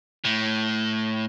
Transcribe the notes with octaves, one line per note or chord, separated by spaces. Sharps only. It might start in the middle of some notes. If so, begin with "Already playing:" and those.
A2